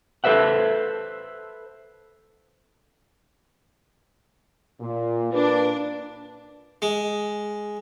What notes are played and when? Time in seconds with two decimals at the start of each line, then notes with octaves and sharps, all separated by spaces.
0.24 A4 B4 C5 E5 F#5
4.81 A#2
5.33 A#2 D4 B4
6.82 G#3